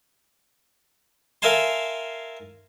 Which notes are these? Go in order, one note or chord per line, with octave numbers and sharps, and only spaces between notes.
A#4 E5 F5 G#5 A5 C6